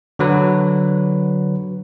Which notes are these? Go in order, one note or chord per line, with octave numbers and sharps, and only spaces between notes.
D3 F#3 B4